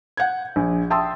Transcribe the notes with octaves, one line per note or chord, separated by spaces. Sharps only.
F#5 G6 G#6
A#1
E5 G5 A5 C6 D#6 E6